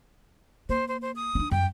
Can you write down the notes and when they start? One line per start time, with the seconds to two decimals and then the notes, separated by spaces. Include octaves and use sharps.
0.69 A#3 C5
0.88 C5
1.02 C5
1.16 D#6
1.35 C#4 D4
1.51 F#2 G5